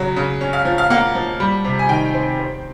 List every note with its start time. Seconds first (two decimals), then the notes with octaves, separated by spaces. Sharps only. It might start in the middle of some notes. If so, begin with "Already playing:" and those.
Already playing: C#3 F#3
0.16 C#3
0.41 C#4
0.53 F5
0.65 F3
0.78 F5
0.90 A#3 F#5
1.15 F3
1.40 G3
1.65 C3
1.79 G#5
1.89 D#3 G5
2.14 C4
2.39 C4